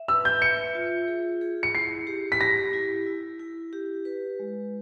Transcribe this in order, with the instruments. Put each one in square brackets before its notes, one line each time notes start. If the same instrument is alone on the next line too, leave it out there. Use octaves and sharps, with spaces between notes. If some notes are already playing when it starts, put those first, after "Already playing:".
Already playing: [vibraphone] E5
[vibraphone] B4 [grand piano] E6
[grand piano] G6
[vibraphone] E5 [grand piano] C#7
[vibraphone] F4
G#4
G#4
[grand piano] C#7
[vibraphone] E4 [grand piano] C7
[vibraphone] G4
[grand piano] B6
[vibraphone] G4 [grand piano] A#6
[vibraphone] E4
E4
E4
G4
B4
G#3